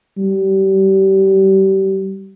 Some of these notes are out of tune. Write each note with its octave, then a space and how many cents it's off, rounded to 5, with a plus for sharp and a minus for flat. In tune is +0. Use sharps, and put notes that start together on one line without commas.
G3 -30